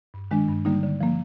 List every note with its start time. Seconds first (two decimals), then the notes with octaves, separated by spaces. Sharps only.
0.14 G2
0.31 D#3 G#3 D4
0.49 G2
0.65 D3 G3 A#3 D#4
0.83 D3
1.01 F3 A#3